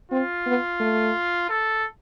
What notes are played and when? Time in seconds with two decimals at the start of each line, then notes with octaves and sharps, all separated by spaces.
0.11 C4 F4
0.46 B3
0.80 A3
1.50 A4